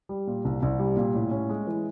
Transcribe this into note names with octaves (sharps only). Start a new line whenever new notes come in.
G3
A#2
C2
C2
G3
A#2
A2
C#4
G#3
E3